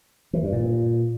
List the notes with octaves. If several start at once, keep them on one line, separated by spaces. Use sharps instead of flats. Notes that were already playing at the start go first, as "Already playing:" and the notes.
E3
G2
A#2